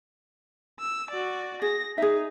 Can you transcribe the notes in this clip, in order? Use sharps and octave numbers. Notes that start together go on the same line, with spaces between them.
E6
F#4 D5
G#4 A#6
D#4 G#4 E5